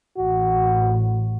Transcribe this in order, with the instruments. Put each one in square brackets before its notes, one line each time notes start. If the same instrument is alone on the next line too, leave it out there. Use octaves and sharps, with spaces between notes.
[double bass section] A1 [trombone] F#4